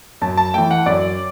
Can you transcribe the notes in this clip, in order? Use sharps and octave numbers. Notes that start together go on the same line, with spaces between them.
F#2 A5
A5
E3 A3 G5
F#5
F#2 D5